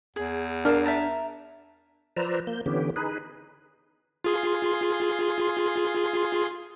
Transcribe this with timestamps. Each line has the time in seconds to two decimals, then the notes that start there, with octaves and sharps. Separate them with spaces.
0.16 E2 G#4
0.65 D4 A#4 F5 A5
0.84 E5 A5 A#5
2.17 F3 B4 C5 D5 A#5 E6
2.47 A#3 G6
2.66 D3 E3 B3 C#4 G4
2.96 D#4 G#4 B4
4.24 F4 G#4 C6